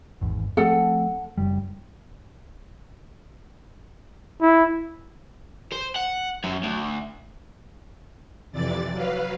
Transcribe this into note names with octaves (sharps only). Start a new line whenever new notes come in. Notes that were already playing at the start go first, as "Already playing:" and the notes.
G#1 E2
F3 A3 C4 A4 F#5
F#1 G3
E4
C5
F#5
F#2
D2
F2 C3 E3 D5 A6
F#3 B4 F5